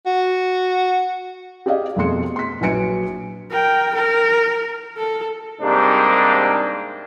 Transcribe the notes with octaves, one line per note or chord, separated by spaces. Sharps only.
F#4
G4 G#4 D5 D#5 F5
F2 B2 A3 G#4 C6 C#7
C6 B6
A#1 F#3 B4 G#5 C#7 D7
A#4 G5
A#4
A4
G#2 C3 G3 A#3 D4 D#4